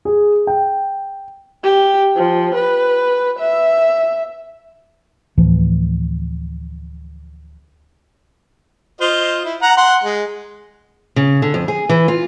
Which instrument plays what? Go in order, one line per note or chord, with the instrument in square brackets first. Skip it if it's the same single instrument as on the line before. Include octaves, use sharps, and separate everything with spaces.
[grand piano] G#4
G5
[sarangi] G4
F3
B4
E5
[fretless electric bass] D2 A2 E3 F3
[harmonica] F4 C5 D#5
E4
F#5 A#5
F#5 C6
G#3
[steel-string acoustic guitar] C#3
D3
F2
G#4
E3
F4